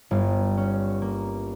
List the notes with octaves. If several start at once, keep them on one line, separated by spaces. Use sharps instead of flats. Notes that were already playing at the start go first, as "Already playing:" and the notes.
G1
C#4
A#3